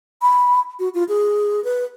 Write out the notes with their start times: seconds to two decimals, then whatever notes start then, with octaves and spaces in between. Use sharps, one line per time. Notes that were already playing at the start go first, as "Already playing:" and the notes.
0.22 B5
0.79 F#4
0.94 F4
1.09 G#4
1.64 B4